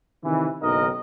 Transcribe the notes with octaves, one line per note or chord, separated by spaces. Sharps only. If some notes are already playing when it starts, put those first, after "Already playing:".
C3 D#3 E3
F#1 B1 D#3 A#4 D#5